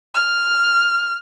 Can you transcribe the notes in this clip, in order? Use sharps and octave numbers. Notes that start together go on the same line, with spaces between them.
F6